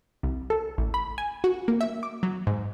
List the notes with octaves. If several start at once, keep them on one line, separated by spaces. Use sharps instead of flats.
C2
A4
A1
B5
G#5
F#4
A#3
E5
D6
F#3
G#2